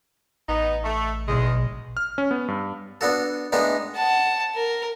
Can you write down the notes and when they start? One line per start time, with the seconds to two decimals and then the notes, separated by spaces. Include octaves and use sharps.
0.49 A1 B3 D#4
0.84 A3
1.28 B1 E2 G#3
1.97 F6
2.18 C#4
2.31 B3
2.48 G2
3.01 B3 D4 F#4 A4
3.52 A2 G#3 B3 D4 D#4
3.95 F#5 A5
4.55 A#4